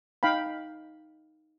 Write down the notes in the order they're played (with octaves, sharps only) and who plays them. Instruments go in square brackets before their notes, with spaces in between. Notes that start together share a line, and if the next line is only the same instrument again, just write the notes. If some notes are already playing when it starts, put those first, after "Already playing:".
[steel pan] D#4 F5 G5 B5